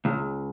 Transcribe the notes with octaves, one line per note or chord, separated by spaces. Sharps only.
C#2